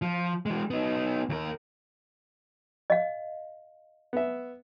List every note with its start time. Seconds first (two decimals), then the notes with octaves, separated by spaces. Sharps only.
0.02 F3
0.46 E3 G#3
0.70 B3 D#4
1.29 D#2 A#4
2.90 D#5 F5
4.13 B3 E5